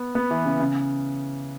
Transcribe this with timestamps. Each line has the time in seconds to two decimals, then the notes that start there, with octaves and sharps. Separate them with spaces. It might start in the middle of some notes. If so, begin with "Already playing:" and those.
Already playing: B3
0.15 B3
0.31 E3
0.45 C#3
0.60 C#3